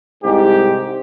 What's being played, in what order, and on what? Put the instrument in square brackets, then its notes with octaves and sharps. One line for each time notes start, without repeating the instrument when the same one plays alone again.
[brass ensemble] C2 G#2 G4